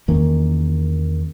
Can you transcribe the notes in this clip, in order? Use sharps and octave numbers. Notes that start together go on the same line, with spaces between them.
E2 D#3 A#3 C#4